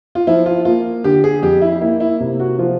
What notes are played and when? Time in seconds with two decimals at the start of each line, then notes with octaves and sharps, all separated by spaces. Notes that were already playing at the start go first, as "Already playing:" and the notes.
0.15 F4
0.27 F3 E4
0.46 F4
0.65 A#3 F4
1.04 D3 G4
1.24 G#4
1.42 F2 G4
1.62 E4
1.81 A#3 E4
2.00 E4
2.20 C3
2.39 F#4
2.58 F3 F4